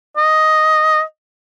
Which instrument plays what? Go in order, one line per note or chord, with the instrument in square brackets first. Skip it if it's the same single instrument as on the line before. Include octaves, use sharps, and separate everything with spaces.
[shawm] D#5